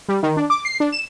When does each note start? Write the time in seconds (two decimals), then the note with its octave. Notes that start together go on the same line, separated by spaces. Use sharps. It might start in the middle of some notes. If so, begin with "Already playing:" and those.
0.09 G3
0.23 D#3
0.37 D4
0.50 D6
0.65 C7
0.80 D4
0.92 E7